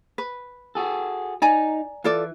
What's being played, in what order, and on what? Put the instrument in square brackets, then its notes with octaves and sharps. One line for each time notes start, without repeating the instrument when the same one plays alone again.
[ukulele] B4
[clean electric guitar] F#4 G#4 A4
[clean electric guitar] D#4 [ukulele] D5 G#5 A#5
[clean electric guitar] E3 [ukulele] F4 A4 D5